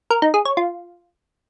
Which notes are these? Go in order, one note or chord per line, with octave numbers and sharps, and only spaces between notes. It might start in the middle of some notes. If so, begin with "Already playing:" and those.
A#4
D#4
G#4
C#5
F4